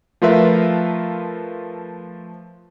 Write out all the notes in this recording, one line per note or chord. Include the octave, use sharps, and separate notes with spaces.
F3 A3 F4 A#4 B4 E5